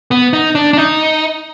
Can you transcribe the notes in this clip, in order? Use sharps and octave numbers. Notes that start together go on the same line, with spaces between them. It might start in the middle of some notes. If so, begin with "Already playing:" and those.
B3
D#4
D4
D4
D#4